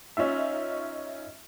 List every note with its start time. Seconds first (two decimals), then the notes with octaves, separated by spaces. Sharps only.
0.17 C#4 D#4 F4 E5